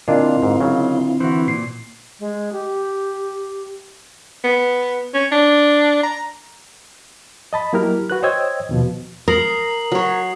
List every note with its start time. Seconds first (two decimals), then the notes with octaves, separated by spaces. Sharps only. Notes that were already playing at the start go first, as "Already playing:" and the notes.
0.08 A#2 D3 C4 D4 E4 F4 A#4 D#5
0.42 G#2
0.60 C#3 F#3
1.20 E3 F#4 C5
1.48 A#2 C7
2.19 G#3
2.52 G4
4.44 B3
5.13 C#4
5.32 D4
6.03 A#5
7.53 D#5 A5 B5
7.73 F#3 A#3 E4 G4 A#4 F6
8.10 F#4 B4 F#6
8.23 C5 C#5 D#5 G5 E6 G#6
8.69 D#2 B2 F3
9.28 A#4 D#6 C7 F#7
9.92 F#3 C#5